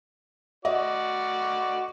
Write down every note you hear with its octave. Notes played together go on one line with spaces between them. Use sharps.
F#4 D5 D#5